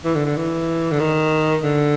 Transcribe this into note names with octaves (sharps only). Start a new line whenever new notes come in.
E3
D3
D3
E3
D3
D#3
D3